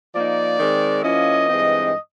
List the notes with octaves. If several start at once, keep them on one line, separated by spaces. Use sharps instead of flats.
F3 A#3 D#4 D5
D#3 G#3 C4
F3 A#3 C#4 E4 D#5
G2 E3 G#3 C4 D#4